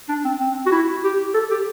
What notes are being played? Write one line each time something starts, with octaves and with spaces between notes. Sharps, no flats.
D4
C4
C4
F#4
E4
G4
A4
G4